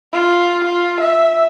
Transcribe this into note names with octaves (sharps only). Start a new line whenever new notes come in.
F4
F4
E5